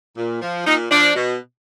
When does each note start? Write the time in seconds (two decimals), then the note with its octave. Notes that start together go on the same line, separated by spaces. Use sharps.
0.17 A#2
0.42 F3
0.66 A#2 D#4
0.91 F3 D4
1.16 B2